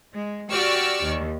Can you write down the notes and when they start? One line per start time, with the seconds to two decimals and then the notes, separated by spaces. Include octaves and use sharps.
0.14 G#3
0.51 F#4 G4 D5 C#6 E6 F6
1.04 D#2